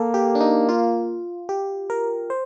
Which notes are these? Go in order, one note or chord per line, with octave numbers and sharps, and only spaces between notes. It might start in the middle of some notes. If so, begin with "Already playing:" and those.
Already playing: A#3 A4 A#4
G4
D4
D#4
F4
G4
A#4
C5